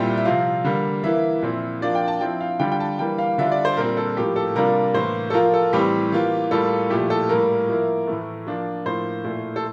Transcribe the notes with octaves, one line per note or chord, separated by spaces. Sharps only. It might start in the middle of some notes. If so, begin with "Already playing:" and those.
Already playing: A#2 G3 C4 E4 G5
E5
C3 F3 C4 F4 F5
D3 G3 A#3
E3 A#3 E4 E5
A#2 F3 C4 E4
F3 A#3 D4 F4 D5
G5
A5
F3 C4 E4 G5
F5
D3 G3 D4 F4 G5
G5
A5
E3 G3 A#3 G5
F5
D3 G3 D4 F4 E5
D5
C5
A#2 G3 C4 A#4
A4
A2 F3 A#3 G4
A4
C3 G3 A#3 D4 F4 A#4
A2 E3 A#3 C5
A4
F3 A#3 F4 A#4
A4
A2 E3 G3 C4 G4
E3 A#3 F4
A2 G3 A#3 F4 A4
A#2 F3 A3 E4 G4
A4
A2 G3 A#3 A#4
F3 A#3 E4
A2 E3 A3
F3 A#3 D4 F4
A2 F3 A#3 C5
A#2 A3 E4
A4